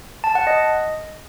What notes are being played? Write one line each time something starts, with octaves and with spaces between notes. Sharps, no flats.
A5
F#5
D#5